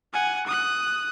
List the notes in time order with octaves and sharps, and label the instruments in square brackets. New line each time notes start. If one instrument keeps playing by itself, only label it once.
[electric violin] F#5 G#5
D#6 F#6